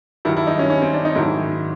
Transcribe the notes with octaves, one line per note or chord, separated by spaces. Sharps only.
G2 D#3 F#3 E4
E4
D#4
C#4
C#4
C4
D4
D#4
G#2 D#3 F#3 E4